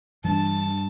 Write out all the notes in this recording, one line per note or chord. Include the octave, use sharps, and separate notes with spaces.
G2 E3 D4 A5